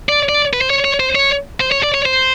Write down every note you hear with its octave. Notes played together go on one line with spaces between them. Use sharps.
D5
D5
B4
C5
C#5
C#5
C5
C#5
C5
C#5
D5
C#5
C5